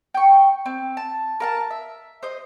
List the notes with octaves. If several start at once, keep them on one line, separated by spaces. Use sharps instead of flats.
G5 C#6
C4
A5
A#4 F5 A5
E5
C5 D#5